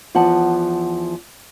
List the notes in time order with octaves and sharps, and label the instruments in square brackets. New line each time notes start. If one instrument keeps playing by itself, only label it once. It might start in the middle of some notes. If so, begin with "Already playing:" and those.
[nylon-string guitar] E2 F3 F#5 A5